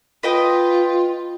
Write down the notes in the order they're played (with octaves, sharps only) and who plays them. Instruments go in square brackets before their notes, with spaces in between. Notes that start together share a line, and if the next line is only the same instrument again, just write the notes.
[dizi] F4 [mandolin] B4 D#5 G5